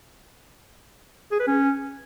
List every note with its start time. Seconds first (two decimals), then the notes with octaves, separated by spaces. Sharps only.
1.31 G#4
1.39 B4
1.47 C#4